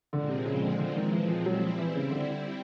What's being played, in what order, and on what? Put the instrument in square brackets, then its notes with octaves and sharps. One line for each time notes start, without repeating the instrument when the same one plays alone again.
[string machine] A#2 F3 G#3 C4 [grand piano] D3
[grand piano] C3
C#3
D3
D3
D#3
E3
F3
[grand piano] F#3 [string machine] G3 C4 E4
[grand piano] F3
E3
C#3
D3